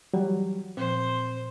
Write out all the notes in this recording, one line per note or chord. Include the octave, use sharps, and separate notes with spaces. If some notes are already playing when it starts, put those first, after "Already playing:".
E3 F#3 G3 F#4
A#2 F3 C4 C5